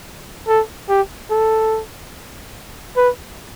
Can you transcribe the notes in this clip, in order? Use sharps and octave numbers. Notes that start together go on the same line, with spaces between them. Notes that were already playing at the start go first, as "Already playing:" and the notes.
A4
G4
A4
B4